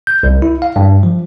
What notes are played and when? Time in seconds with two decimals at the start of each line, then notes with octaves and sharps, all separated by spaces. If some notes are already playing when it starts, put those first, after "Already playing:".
0.07 G6
0.23 C2
0.42 E4
0.62 F5
0.76 G2
1.03 F3